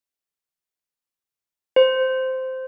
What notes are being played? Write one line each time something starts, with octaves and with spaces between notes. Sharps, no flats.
C5